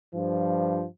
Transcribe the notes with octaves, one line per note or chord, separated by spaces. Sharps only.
G2 F3